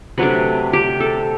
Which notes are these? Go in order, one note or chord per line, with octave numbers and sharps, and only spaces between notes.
C3 F#3 A3 D4 B4
G4
A4